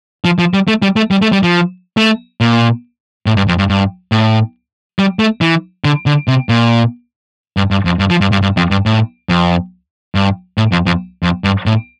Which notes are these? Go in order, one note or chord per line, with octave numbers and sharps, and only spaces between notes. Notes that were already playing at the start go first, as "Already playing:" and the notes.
F3
F3
G3
A3
G3
A3
G3
A3
G3
F3
A3
A#2
A2
G2
F2
G2
G2
A2
G3
A3
E3
D3
D3
C3
A#2
G2
G2
F2
G2
F3
G2
G2
G2
F2
G2
A2
F2
G2
A2
F2
F2
F2
G2
A2